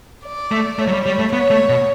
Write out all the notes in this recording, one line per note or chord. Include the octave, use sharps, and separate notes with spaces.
D5
A3
A3 C#5
F#3
G3
G3
A3
B3 C#5
A3
B2